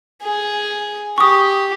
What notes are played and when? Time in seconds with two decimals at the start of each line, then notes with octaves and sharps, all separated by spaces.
0.23 G#4
1.18 G4 C#6 D#6